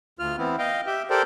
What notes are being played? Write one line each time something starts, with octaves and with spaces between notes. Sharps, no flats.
D2 F4 F6
E3 B3 C4 E4
D#5 F5 G5
G4 E5 G5
G4 A4 A#4 C5 D5 G5